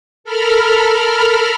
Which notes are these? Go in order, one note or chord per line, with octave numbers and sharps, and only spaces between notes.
A4 A#4 B5 F6